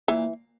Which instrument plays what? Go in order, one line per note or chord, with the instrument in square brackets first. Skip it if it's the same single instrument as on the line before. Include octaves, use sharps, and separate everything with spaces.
[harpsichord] A#2 [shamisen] E3